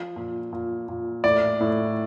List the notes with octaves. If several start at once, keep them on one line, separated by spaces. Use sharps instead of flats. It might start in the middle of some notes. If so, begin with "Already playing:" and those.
Already playing: F3
A#2
A#2
A#2
A2 D5
A2